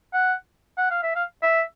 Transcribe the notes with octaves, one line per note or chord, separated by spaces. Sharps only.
F#5
F#5
F5
E5
F5
E5